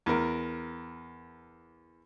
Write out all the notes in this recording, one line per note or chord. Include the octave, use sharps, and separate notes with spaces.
E2 A#4